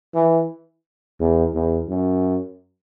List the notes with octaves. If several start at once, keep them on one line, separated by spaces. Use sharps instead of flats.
E3
E2
E2
F#2